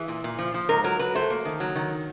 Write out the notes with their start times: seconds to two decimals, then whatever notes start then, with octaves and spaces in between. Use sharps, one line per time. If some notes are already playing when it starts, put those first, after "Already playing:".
Already playing: E3 G#4
0.08 A#2
0.24 A#2
0.39 F3
0.54 F3
0.69 G#2 A#4
0.84 F#3 A#4
0.99 F#3 B4
1.15 A3 C5
1.30 A#3
1.45 D#3
1.60 F#3
1.75 D#3